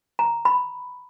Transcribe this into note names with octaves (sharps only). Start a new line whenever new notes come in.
A#5
B5